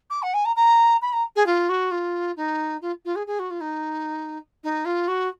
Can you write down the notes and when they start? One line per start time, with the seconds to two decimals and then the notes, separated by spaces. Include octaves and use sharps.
0.10 D6
0.22 F#5
0.34 G#5
0.45 A#5
0.56 A#5
1.02 B5
1.13 A#5
1.36 G#4
1.46 F4
1.69 F#4
1.91 F4
2.37 D#4
2.82 F4
3.05 F4
3.16 G#4
3.27 G#4
3.39 F#4
3.50 F4
3.61 D#4
4.64 D#4
4.85 F4
5.08 F#4